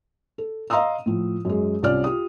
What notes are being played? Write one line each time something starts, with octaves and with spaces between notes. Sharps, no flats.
A4
D#5 F5 A#5 C6 D#6 E6
A2 F3
F#2 G#3
C2 C#4 F4 D5 F6
F4 G4 D#6